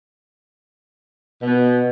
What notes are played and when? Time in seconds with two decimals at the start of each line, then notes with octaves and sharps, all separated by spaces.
1.42 B2